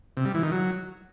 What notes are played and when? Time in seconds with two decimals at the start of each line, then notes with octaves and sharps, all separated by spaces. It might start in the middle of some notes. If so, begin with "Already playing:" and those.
0.17 C3
0.26 G3
0.34 E3
0.43 D#3
0.52 F#3